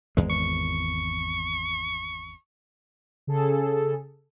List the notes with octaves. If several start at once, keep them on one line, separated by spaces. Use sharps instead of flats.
G#1 E2 G#3
C#6
C#3 G#4 A4